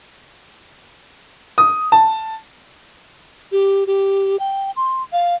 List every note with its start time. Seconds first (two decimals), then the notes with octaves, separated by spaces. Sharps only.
1.58 D#6
1.92 A5
3.52 G4
3.87 G4
4.40 G5
4.76 C6
5.13 F5